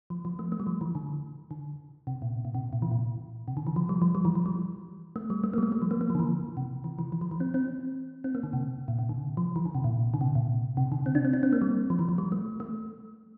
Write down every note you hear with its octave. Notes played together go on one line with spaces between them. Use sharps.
F3
F3
A3
A3
G3
F3
E3
D3
D3
C3
A#2
A#2
C3
A#2
E3
A#2
C3
D3
E3
F3
G3
F3
G3
E3
F3
G3
A3
G3
A3
G3 A#3
A3
G3
F3
A#3
A#3
F3
D3
E3
C3
E3
E3
E3
F3
E3
C4
C4
C4
A#3
D3
C3
A#2
C3
D3
F3
E3
D3
C3
A#2
D3
C3
A#2
C3
D3
C4
D4
C4
D4
C4
A#3
G3
F3
E3
F3
G3
A3
A3